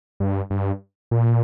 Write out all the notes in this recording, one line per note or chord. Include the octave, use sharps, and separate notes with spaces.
G2
G2
A#2